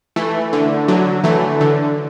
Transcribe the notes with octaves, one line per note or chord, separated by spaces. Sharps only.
E3 A3
D3
D3 F#3
E3 A3
D3